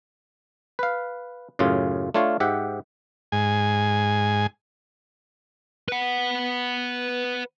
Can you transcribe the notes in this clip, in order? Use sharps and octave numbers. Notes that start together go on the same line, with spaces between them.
B4 F5
F#2 A2 C#3 F4
A3 D4 F4 C#5 F5
G#2 G4 E5 F#5
G#2 G#5
B4 F#5